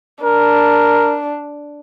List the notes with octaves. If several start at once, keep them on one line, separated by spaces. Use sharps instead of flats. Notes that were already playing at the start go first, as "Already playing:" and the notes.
D4 A#4